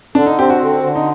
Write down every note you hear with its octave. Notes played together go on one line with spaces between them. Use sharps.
D3 D4
D#4
C4 G4
F#4
D3
D3
D#4